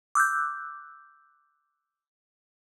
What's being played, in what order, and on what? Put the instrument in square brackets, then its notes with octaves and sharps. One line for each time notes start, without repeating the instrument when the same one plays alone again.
[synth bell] D6 E6 F#6 G6